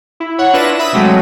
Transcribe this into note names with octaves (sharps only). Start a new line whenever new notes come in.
E4
C#5 F#5
D4 E4 F4 B4 A#6 E7
E5 B5 D#6 E6
C3 F#3 G#3 A3